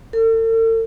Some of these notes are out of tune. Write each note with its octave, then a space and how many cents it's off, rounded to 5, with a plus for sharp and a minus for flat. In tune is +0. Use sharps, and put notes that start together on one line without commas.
A4 +45